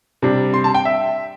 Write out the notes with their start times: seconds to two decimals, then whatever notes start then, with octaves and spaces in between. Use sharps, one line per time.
0.22 C3 G3 D4
0.54 C6
0.64 A5
0.75 G5
0.85 E5